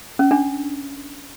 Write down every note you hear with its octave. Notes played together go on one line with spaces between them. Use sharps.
C#4
D4